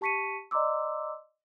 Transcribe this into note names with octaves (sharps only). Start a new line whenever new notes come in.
G4 A5 C#6 B6 C#7 D#7
D5 D#5 A#5 C6 D6 E6